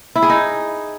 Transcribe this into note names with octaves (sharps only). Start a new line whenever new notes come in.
E4
G#4
D#4